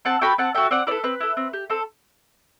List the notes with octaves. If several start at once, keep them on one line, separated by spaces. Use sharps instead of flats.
C4 F#5 A5
F#4 A4 G5 B5
C4 F#5 A5
F#4 A4 E5 G5
C4 D5 F#5
E4 A4 B4 D5
C4 B4
E4 A4
C4
G4
C4 A4